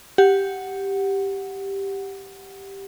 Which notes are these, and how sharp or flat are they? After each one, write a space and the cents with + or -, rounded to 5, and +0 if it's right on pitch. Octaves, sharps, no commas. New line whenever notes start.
G4 +0 F#5 +0